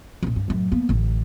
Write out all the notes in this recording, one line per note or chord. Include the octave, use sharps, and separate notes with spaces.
D#1 A#1
G2
F#2 A2
A#3 B3
A1 D3